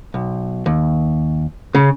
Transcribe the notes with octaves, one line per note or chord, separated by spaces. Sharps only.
B1
D#2
C#3